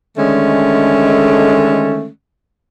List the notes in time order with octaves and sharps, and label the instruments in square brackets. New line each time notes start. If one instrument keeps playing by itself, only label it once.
[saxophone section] D3 D#3 G#3 A3 C#4